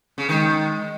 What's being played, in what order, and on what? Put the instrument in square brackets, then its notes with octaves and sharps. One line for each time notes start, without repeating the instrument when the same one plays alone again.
[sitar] C#3
[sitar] D#3 [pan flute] G#3